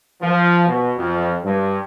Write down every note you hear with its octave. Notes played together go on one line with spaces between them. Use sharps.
F3
B2
F2
G2